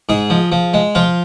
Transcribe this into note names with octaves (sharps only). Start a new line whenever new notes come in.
G#2 G#4
F3
F3
G#3
F3 F4